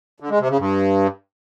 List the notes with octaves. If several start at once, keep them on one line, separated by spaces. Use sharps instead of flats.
D3
G#3
C3
C#3
G2